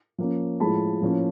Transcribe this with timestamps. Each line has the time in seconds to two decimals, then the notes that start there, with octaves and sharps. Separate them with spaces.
0.18 F3 A#3 C#4
0.60 A2 F3 G#3 A5 B5
1.01 A2 F3 A#3 C#4